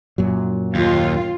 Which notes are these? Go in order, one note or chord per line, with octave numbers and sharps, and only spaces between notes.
F#2 A#2 F#3
D#2 F4